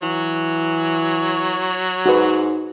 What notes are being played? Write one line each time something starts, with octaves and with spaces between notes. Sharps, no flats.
E3 F#3 C#5
G#2 F#4 B4